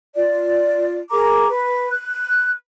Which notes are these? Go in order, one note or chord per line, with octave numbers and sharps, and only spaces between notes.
F4 D5
G#4 A#4 A#5 D6
B4
F#6